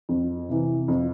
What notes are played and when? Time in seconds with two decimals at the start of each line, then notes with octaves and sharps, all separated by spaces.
0.09 F2
0.49 C3 E3
0.88 F2